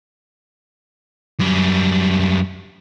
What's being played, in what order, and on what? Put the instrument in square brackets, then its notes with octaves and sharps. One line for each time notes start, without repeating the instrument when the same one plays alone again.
[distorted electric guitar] F#2 G3